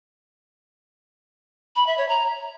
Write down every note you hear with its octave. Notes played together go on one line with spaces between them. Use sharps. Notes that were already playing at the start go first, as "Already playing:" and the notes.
B5
E5
C#5
A#5